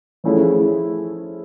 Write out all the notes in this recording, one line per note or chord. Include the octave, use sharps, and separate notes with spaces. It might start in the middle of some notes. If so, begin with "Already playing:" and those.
F3 A3 C#4 E4 G#4